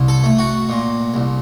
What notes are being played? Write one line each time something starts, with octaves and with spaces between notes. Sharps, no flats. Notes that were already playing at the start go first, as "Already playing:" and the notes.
Already playing: C2
A4
A3
F#4
A#2
C2